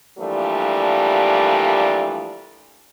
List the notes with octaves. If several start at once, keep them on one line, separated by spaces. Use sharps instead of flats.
E3 F3 G3 A3 A#3 D4